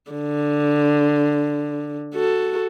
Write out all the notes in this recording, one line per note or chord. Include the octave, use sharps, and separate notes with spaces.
D3
F#4 A4